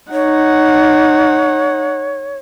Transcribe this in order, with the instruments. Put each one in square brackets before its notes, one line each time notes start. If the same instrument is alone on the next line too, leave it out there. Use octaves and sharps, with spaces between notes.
[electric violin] D#4 F#5 [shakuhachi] C#5